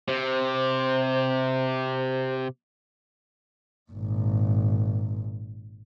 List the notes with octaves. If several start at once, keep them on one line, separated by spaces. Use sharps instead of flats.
C3 C5
G#1 A#2